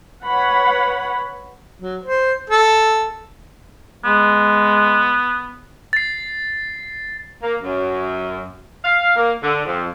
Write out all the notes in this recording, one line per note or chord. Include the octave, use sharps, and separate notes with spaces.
B4 C#5 F#5 B5
F#3
C5
A4
G#3 B3
A6 C7
A#3
F#2
F5
A#3
D3
F2